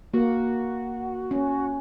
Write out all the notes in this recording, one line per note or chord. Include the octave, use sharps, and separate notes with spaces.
A#3 F#4
C#4